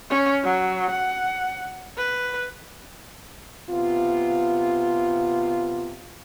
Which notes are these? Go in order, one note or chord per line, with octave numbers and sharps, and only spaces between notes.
C#4
F#3
F#5
B4
C3 B3 F4